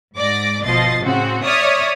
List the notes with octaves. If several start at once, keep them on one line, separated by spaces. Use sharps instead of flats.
G#2 D5 D6 A#6
G1 B2 F3 D#5 A6 C7
A2 C#3 C4 F#4
C#5 D5 E5 C#6 D#6 F6